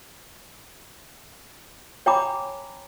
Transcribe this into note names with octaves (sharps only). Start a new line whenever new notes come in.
C#5 G5 G#5 A#5 B5 D6